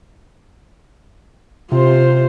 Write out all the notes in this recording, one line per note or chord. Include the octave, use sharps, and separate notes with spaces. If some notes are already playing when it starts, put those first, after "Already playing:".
C3 F4 C5